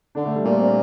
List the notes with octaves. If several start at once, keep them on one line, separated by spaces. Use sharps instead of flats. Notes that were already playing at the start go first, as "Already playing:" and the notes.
D3 D4
A3
G3
A#2 A#3
C4